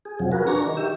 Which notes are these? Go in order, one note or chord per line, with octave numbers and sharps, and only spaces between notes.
G#4
F2 C3 F3 F#3
F#4 G#4 A#4 B4
D4 A#5 C#6
D#3
G4 E5